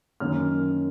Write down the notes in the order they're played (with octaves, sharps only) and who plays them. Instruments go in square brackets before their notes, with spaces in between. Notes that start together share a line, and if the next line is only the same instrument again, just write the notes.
[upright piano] F#2 D#3 A#3 C#4 F6